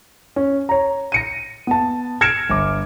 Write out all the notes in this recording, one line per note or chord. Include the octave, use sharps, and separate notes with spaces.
C#4
C#5 A#5
A#6 C#7 D#7
B3 A5
F6 G#6 A#6 C#7 D7 E7
G1 D6